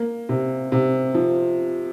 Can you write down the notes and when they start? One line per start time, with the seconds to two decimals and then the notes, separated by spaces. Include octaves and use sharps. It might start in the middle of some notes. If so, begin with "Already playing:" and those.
Already playing: A#3
0.29 C3
0.72 C3
1.15 F3